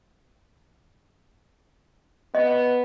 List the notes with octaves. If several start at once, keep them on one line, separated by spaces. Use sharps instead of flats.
B3 D#5